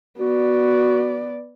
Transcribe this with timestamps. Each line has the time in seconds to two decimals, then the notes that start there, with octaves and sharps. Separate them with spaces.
0.19 B3 F#4 D5